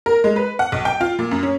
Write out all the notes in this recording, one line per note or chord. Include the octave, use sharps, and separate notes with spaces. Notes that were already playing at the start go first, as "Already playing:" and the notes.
A#4
G#3
B4
F#5
B1
G5
F4
A#2
F#2
C#4